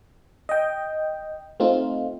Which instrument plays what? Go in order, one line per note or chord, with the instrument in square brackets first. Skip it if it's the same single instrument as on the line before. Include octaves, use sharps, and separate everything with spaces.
[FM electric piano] D#5 G5
A3 C4 D#4 F4